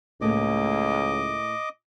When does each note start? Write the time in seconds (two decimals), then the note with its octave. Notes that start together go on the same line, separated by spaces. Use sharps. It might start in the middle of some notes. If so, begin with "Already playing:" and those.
0.21 C#2 A2 A3 A#3 D#5 D6